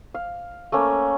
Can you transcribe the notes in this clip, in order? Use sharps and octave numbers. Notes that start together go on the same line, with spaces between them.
F5
A3 A#3 C#4